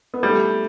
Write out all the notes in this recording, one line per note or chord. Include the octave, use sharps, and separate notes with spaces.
B3
G3 A3